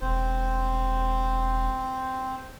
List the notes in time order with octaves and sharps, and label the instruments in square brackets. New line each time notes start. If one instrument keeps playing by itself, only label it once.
[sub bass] E1 [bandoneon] C4 C5